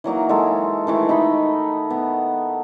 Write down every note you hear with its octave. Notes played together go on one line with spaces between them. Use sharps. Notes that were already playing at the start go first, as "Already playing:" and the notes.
E3 F#3 A#3 D#4
G#3 A4 A#4
D#3 E3 A3
D#4 D#5 B5
B3